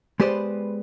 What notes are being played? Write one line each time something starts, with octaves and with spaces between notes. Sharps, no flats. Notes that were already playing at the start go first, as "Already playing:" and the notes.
G#3 B3 G4 B4 C5 D5